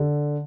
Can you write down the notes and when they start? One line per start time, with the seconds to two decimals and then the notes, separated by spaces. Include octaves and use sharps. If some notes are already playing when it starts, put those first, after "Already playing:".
Already playing: D3